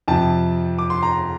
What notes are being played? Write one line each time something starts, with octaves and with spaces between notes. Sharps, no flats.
F2 C3 F3 A5
D6
C6
A#5